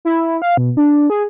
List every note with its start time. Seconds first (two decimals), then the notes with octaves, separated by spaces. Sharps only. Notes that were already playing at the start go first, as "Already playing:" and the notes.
0.05 E4
0.42 F5
0.57 B2
0.77 D4
1.10 G#4